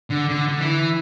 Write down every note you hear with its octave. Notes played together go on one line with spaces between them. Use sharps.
D3
D3
D3
E3